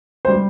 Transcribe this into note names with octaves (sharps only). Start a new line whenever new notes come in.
C5
G3